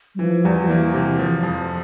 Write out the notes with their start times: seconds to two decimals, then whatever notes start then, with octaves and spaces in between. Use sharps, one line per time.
0.15 G3
0.19 E3 F3
0.44 E2 G3
0.64 F3
0.69 E3 A#3
0.94 C3
1.19 F3
1.43 F2